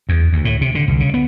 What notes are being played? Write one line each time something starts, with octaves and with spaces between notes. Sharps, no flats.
E2
D2
A2
C3
D3
C2
C#3
B3